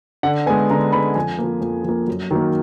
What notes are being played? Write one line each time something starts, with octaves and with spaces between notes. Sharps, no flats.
D3 F#5
G#3 B3 G#5
D3 A#5
G#3 B3 B5
F2 G#5
F3 A#3
F2
F3 A#3
F#2
D#3 F#3 A#3